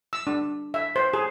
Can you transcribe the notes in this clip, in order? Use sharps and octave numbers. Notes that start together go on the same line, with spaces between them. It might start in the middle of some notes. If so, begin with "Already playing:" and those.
E6
D4
E5
C5
G#4